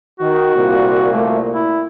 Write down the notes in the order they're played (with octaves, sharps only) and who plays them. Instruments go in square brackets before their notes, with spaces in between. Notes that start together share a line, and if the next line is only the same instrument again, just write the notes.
[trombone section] D#3 [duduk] F#4
[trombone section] C2 A#2
[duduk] A3
E4